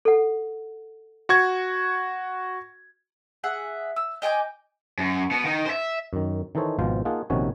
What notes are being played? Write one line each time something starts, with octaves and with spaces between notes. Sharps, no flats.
A4 F#5
F#4 C#6 G#6
G#4 E5 F#5
E6
D#5 G5 G#5 D6
F#2
B2 B3
D#3 D#4
C5 E5
F#2 D#3
D#3 E3 D#4 A4 C5 C#5
G#1 B2 F3 C5 F5
A#3 D#4 F4 G#4 F#5 A5
A#1 C3 D#3 C#4 F#4 G#5